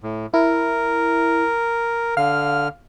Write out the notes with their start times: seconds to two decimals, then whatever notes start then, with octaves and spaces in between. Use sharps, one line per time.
0.03 A2
0.34 E4 A#4
2.17 D3 F5 F6